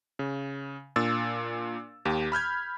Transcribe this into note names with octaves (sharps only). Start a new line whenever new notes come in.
C#3
A#2 D4 E6 A6
D#2 G4
B5 F6 G6 G#6